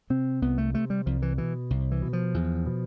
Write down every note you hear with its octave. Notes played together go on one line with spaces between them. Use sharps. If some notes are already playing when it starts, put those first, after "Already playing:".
C3 C4
C2 B3
A3
C3 A3
G3
C2 F3
E3
B2 E3
C2
E3
B2
F3
E2
B2